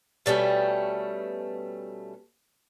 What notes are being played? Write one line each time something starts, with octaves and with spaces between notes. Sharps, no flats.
B2 G3 A3 C#4